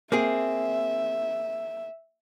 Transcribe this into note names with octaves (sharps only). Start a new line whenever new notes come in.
A#3 C4 G#4 E5